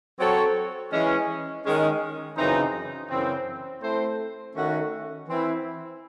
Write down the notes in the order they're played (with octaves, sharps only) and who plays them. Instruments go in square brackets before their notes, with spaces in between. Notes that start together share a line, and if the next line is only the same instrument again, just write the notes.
[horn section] F#3 C4 F#4 A4 C#5
E3 G#3 C#4
D#3 G#3 C#4
F#2 C#3 E3 C4 D#4
F#2 C#3 E3 C4
A3 C4 E4 C5
D#3 A3 C#4 F#4
E3 C4 E4